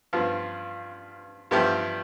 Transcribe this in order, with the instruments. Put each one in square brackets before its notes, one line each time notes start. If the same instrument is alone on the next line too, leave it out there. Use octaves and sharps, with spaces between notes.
[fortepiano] G2 F3 B3 F4
G2 F3 B3 E4 G4